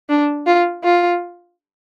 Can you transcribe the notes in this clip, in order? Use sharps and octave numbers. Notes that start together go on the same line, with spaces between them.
D4
F4
F4